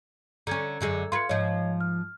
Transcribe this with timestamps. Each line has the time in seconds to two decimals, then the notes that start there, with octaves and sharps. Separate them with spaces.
0.47 D3 C#4 A#5 G#6
0.81 F#2 D3 G#3
1.12 F4 B4 C6 G#6 C#7
1.29 G#2 F3 C#5 D#5 G#6
1.81 F6